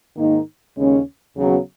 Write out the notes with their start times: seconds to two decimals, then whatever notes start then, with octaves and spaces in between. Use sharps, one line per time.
0.16 G#2 D#3 A#3 D#4
0.77 D#2 C#3 G#3 C#4
1.36 D#2 C#3 F#3 B3